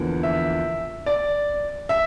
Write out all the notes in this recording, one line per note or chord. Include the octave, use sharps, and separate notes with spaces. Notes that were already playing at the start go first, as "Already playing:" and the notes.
Already playing: E2 D3 F3 A#3
E5
D5
E5